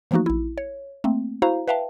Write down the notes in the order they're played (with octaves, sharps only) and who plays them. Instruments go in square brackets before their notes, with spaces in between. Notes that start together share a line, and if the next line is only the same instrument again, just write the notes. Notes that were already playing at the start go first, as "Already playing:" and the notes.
[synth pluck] E3 F3 A3 A#3 D#4 F#4
A#1 E4
C#5
A3 A#3 C4
E4 F#4 C5 F5 A#5
B4 E5 F5 G5 A5